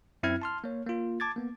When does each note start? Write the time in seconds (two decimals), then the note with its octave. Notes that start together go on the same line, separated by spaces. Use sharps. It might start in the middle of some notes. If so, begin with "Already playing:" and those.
0.23 F#2 C4 E4 E5 F6 G#6
0.42 A5 C6 F6
0.64 A#3 C#5
0.86 A#3 F4
1.20 A5 D6 G#6 A6
1.36 A#3 B3